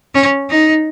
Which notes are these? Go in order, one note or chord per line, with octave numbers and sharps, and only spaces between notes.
C#4
D#4